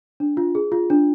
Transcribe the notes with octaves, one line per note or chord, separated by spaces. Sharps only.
D4
F4
G#4
F4
D4